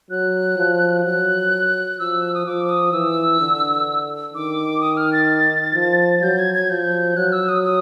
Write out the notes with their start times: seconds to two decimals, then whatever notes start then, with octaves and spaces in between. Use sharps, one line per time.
0.10 F#3 F#6
0.58 F3
1.05 F#3 F#6
1.99 F3 E6
2.34 D#6
2.46 F3 D6
2.69 D#6
2.93 E3 E6
3.40 D3
4.34 D#3 D6
4.81 D#6
4.97 F6
5.13 A6
5.75 F3
6.22 F#3 G6
6.39 G#6
6.54 G#6
6.70 F3 G6
7.17 F#3 F#6
7.32 E6
7.49 D#6
7.63 D#6